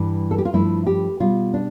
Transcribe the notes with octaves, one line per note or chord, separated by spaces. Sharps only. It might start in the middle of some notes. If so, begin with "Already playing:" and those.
Already playing: G2 E3 G3
A4
G4
F4
G2 F3 A3 E4
G4
B2 G3 F4
D4